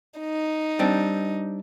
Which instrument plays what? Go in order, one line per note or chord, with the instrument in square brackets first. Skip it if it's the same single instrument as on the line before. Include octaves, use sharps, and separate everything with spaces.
[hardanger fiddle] D#4
[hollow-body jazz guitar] G3 C4 D4